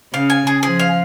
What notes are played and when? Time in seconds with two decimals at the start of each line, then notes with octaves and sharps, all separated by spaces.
0.14 C#3 F5
0.30 G#5
0.47 G#4
0.63 F3 G#4
0.79 F5